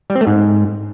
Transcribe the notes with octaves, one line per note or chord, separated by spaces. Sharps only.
G3
C4
A3
G#2